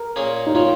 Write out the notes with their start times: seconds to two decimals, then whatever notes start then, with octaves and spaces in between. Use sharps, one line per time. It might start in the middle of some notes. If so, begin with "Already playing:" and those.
Already playing: A#4
0.16 A#2 A#3 C#4 G#4
0.47 D#4
0.55 D#3 C#4 F4